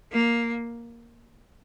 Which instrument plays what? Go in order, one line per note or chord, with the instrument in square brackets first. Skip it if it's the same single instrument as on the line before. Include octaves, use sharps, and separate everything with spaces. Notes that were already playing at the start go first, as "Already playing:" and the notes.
[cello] A#3